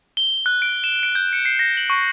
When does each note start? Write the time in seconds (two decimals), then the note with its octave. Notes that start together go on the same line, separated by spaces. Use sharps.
0.17 G7
0.46 F#6
0.62 D7
0.84 E7
1.03 D7
1.15 G6
1.33 C#7
1.45 C7
1.59 A#6
1.77 F#7
1.90 C#6